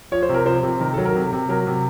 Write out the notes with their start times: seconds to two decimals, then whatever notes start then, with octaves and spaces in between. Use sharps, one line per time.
0.12 F3 C#5
0.23 C5
0.29 C3
0.34 A#4
0.46 F3 C5
0.63 C3
0.80 D#3 A#4
0.94 F#3 A4
1.06 A#4
1.15 C3
1.33 C3
1.49 F#3 A#4
1.67 C3